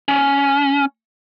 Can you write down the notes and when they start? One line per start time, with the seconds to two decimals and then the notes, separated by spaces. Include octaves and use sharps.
0.08 C#4